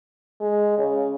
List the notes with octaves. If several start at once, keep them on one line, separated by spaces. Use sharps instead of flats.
G#3
C#3